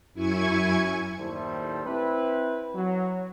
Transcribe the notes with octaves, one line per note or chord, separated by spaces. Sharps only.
F#2 E4 G#5 C#6 G#6
D#2 A2 G3 E4 A4 C5
C4 E4 B4
F#3